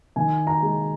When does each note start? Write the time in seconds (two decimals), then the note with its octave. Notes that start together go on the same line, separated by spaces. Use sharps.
0.16 D#3 G#5
0.47 A#5
0.62 G#3